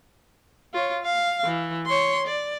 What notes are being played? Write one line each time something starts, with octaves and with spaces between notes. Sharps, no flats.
F4 C#5
F5
E3
C#5 C6
D5